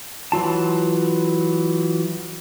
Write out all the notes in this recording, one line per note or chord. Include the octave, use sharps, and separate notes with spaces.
E3 F#3 F4 A5